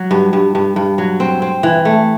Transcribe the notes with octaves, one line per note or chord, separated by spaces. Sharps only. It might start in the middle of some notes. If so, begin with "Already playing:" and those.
Already playing: F#3
G2
G2
G2
G2
F#3
C4
C4
E3
A3